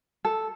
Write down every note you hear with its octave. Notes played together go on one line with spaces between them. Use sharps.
A4